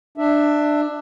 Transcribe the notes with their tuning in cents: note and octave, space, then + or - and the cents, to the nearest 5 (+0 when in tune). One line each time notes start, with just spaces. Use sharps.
D4 +15 E5 +0